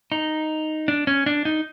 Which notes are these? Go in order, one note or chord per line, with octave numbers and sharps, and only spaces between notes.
D#4
D4
C#4
D4
D#4